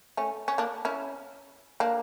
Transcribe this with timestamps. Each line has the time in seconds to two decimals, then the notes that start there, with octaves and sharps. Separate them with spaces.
0.17 A3 C#4
0.48 C#4
0.58 A#3 D4
0.85 C#4 E4
1.80 A#3 D4